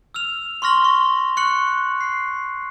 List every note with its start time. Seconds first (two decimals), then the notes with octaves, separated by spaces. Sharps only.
0.14 E6 F6 F7
0.62 C6 C#6 F6 A#6 F#7 G7
0.85 C#6
1.37 C#6 F#6 C#7 F#7
2.01 C7